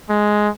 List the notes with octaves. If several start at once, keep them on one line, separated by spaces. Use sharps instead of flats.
G#3